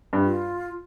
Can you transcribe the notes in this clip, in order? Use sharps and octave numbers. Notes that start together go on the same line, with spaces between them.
G2
F4